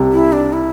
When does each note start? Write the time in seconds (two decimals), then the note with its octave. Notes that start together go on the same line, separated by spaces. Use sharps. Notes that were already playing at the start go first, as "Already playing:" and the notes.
Already playing: C2 C3
0.12 E4
0.33 D4
0.53 E4